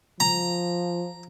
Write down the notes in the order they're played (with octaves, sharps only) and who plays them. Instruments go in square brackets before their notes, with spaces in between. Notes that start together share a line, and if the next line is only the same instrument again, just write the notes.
[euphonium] F3 [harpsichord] A#5